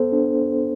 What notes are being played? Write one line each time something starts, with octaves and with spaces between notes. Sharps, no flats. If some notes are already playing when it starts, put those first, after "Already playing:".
Already playing: B3 A4 C5
D4